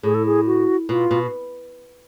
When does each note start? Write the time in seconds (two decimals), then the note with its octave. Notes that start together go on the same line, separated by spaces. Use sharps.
0.03 A2 G#4
0.14 A4
0.26 G#4
0.47 F#4
0.89 B2 F4
1.11 B2